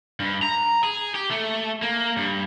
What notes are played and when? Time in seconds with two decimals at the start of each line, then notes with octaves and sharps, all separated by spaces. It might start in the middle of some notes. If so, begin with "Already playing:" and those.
0.20 G2
0.42 A#5
0.83 G#4
1.15 G4
1.31 A3
1.82 A#3
2.17 G2